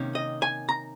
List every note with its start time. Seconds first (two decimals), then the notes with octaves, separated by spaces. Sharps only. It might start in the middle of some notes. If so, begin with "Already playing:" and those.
Already playing: C3 D#3 A#3 C#4
0.15 D#5
0.42 G#5
0.69 A#5